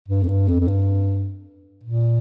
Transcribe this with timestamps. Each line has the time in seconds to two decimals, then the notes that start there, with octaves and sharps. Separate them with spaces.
0.08 G2
0.23 F2
0.28 G2
0.48 F2
0.60 F2
0.68 G2
1.83 A#2